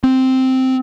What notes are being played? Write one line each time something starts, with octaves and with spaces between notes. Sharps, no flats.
C4